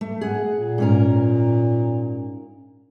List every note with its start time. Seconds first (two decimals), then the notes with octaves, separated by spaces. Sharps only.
0.01 A3
0.21 G#4 F#5
0.55 A#2
0.78 G#2 C#4 A#4